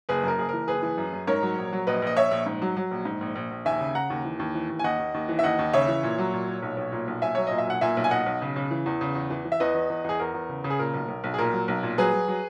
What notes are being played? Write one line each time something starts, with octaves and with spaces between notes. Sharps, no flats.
F#1 G#4 B4
F#2 A#4
F#1 G#4
E3 A#4
F#1 G#4 B4
E3
F#2
F#2
G#2 A#4 C#5
F#3
A#1
F#3
A#1 B4 D#5
A#1 D#5
A#1 C#5 E5
A#1
G#2
F#3
F#3
A#1
G#2
A#1
A#1
A#1
D#2 E5 G#5
C#3
C#3 F#5 A#5
D#2
E3
D#2
E3
D#2
G#5
D#2 D#5 F#5
D#2
D#2
E3
E5
D#2 D#5 F#5
D#2
C#3 C#5 E5
E3
A#2
F#3
A#2
A#2
B1
B1
A#2
B1
B1 E5 G#5
F#3 C#5
A#2 D#5
E5
B1 F#5
A#2 E5 G#5
B1
G#5
B1 D#5 F#5
B1
C#3
C#3
E3
E2
C#3
E2
E3
E3
E5
E2 B4 D#5
E2
E2
E2 G#4
E2 A#4
E2
C#3
C#3
G#4
A#2 A#4
B1
B1
B1
G#4
A#2 A#4
F#3
B1
A#2
F#3 G#4 B4
F#3
F#3